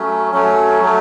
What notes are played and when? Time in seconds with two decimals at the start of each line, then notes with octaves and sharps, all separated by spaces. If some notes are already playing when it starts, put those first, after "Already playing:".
Already playing: F#3 A3 C#4
0.32 F#3 A3 C#4
0.82 F#3 A3